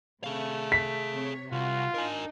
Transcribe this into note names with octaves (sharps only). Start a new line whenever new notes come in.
C3 A3 G#4 F5
B6
C3 C#5
C2 F4 F#4
D4 D#4 A#4 G#5